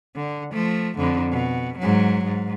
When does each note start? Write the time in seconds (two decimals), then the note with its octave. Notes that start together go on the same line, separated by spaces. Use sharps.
0.16 D3
0.53 F3 A3
0.98 F2 D3
1.32 B2
1.79 G#2 F#3
2.25 G#2